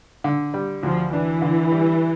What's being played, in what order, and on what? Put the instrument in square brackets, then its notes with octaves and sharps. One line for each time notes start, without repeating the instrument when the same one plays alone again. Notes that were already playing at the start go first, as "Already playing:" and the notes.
[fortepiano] D3
G3
[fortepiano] D2 [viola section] F3
[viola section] E3 [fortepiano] D4
[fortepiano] D3
G3